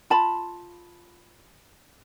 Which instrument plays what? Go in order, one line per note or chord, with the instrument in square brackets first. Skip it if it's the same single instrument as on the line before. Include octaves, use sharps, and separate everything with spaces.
[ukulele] F4 A5 B5